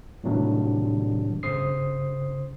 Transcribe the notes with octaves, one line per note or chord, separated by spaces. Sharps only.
A2 C3 D#3 F#3 G3 D4
G2 C#3 C5 D#6 C7